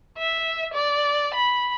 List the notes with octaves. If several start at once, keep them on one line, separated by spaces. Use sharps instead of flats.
E5
D5
B5